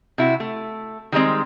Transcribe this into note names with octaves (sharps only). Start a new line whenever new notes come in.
C3 E4 F#4
A3
D#3 G3 G#3 C4